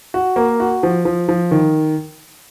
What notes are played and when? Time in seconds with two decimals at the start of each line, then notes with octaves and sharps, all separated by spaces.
0.14 F#4
0.36 A#3
0.60 F#4
0.83 F3
1.05 F3
1.29 F3
1.51 D#3